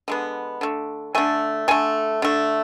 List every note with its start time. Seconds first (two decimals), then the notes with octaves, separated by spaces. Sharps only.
0.08 D3 G#3 B3
0.61 D3 A3
1.15 D3 A3 G#5
1.68 D3 A3 G#5
2.22 D3 A3